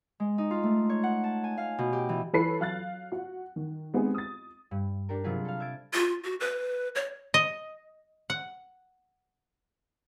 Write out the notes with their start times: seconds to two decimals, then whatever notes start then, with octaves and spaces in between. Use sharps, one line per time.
0.20 G#3
0.38 D#4
0.51 F4
0.63 A3
0.89 C#5
1.03 F#5
1.24 A5
1.44 G#5
1.58 F5
1.79 B2
1.93 G4
2.09 E3
2.33 E3 A4 B4 C#5 B5 C7
2.60 F#3 F5 F#6 A6
3.12 F#4 F#5
3.56 D#3
3.94 G#3 B3 C4 D#4 G4 G#4
4.14 D#6 A6
4.71 G2
5.09 D4 G4 A4 A#4
5.24 C3 F#3 D4 F4 G#4 B4
5.45 A4 F5
5.60 E5 G#6 A6 D7
5.93 F4
6.24 F#4
6.40 B4
6.95 C#5
7.34 D#5
8.30 F#5